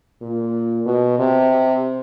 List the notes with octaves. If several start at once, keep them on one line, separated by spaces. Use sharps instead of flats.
A#2
B2
C3